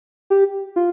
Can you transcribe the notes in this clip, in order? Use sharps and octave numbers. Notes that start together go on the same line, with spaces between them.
G4
F4